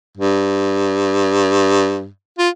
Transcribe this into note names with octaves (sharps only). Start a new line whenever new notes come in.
G2
F4